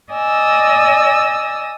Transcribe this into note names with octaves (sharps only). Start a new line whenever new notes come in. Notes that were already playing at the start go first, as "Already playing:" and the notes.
D5 D#5 G#5 D#6 E6